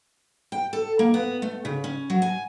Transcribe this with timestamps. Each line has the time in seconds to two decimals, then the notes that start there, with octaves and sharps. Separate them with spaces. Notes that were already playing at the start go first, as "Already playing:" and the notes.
0.52 G5
0.73 A4
0.99 A#3
1.14 B3
1.42 A3
1.65 C#3
1.84 C#4
2.10 F#3
2.22 G#5